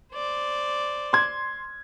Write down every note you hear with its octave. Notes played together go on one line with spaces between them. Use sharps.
C5 D5
C6 G#6